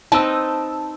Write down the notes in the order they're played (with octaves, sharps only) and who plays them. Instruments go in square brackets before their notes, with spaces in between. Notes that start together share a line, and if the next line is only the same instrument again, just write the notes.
[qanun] C4 D#4 B4 [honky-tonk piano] A5 E6